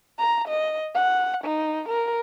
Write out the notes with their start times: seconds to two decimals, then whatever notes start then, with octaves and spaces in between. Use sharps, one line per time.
0.19 A#5
0.48 D#5
0.95 F#5
1.44 D#4
1.89 A#4